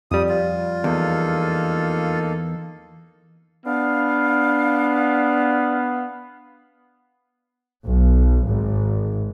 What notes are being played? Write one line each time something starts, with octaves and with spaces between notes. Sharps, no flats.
F2 G3 D#6
F4
E2 A#3 D#4 A4
B3 D4 F5
B1
G#1